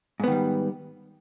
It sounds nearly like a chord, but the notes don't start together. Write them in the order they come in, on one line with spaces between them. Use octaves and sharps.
G#2 B3 D#3 G3